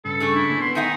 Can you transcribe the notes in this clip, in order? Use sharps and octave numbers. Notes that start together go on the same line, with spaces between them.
G2 C#3 A4
A3 D4 G#4
E4
A#2 D3 A#3
B3 C6
D#3 D#4 E5 F#5 G#5